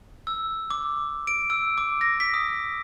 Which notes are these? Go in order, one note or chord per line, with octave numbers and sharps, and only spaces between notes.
E6
D6
D7
E6
D6
A#6
B6
D#6